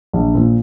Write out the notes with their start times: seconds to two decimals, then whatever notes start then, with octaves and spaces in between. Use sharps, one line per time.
0.13 A#1
0.34 A#2 F3